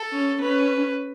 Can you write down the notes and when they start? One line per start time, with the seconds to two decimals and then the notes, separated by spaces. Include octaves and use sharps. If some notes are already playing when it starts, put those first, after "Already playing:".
Already playing: A4
0.12 C#4
0.40 C#4 B4